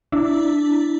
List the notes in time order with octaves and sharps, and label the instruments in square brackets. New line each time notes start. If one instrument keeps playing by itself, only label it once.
[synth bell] D4 E4